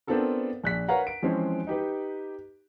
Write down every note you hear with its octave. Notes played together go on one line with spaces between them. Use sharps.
B3 C4 D4 F4 A4 A#4
A#1 F#6 B6
A#4 B4 C#5 F5 F#5 A#5
D7
E3 F3 G#3 C4 C#4
D#4 G4 B4